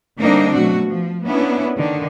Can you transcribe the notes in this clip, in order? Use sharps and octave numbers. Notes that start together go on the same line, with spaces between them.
D3 G3 A#3 C4 D4 D#4
B2 F#3 A3 F#4
F3
A#3 B3 C#4 D4 E4
D3 D#3